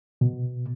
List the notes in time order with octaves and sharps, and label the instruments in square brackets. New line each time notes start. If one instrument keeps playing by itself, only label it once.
[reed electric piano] B2